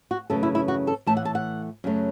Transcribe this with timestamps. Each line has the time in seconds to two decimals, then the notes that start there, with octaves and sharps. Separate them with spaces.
0.11 F#4
0.30 F#2 C#3 E3 A3 A4
0.43 E4
0.55 E4
0.68 F#4
0.87 A4
1.06 A2 E3 A3 A5
1.17 F#5
1.25 A5
1.35 F#5
1.84 F#2 C#3 F#3 A3